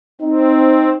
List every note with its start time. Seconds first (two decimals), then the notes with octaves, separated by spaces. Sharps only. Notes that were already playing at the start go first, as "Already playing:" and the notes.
0.21 C4 D#4